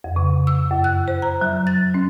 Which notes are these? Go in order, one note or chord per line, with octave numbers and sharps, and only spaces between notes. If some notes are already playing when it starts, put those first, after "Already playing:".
F2
C#3
E6
F#2
F#6
C5
A#5
F#3
A6
C#4